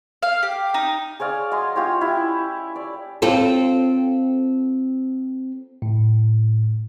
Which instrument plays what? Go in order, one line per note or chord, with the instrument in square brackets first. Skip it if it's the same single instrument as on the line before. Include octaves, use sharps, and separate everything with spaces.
[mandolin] F5
G4
D#4
[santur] G#4 C#5 D5 F5
F#3 D#5 G#5 C6
C#4 F4 G4 C#5
E4 G4
D5
[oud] C4 F4 A4
[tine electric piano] A2